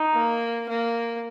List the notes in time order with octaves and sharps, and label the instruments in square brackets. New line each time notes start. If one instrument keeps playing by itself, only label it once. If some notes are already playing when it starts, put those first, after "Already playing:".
Already playing: [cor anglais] D#4
[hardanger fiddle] A#3
A#3